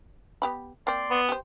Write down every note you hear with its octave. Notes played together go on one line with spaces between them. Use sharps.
B3 G4 B5
A#3 C4 D5 C6
B3
G4 C5